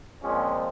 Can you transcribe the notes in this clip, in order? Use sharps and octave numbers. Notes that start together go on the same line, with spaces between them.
A#2 F3 G#3 C4 C#4